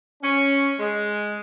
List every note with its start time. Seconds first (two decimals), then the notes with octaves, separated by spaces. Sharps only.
0.22 C#4
0.79 G#3